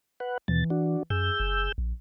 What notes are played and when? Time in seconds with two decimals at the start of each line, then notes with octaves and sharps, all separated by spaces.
0.20 B4 F#5
0.48 D#2 B2 E3 A6
0.70 D4 F#4
1.10 F#2 G#4 E6 G6
1.40 F#1
1.78 A#1